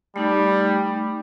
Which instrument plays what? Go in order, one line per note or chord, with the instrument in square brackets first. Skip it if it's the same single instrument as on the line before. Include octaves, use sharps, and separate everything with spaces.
[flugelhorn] G3 [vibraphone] A3 D#4